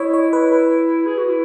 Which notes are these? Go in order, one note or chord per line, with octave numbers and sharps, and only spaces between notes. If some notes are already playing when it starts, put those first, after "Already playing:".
Already playing: E4 C#5 D#5
C#5
B4
B4
G#4
F#4
E4